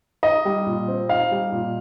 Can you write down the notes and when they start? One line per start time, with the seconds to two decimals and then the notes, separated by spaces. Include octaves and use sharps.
0.23 D#4 D#5
0.45 G3
0.66 A#2
0.88 C4
1.09 D#4 F5
1.32 G3
1.52 A#2